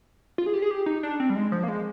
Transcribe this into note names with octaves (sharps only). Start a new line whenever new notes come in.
F4
G#4
G4
G#4
G4
D#4
D4
C4
G3
G#3
F3
A#3
G#3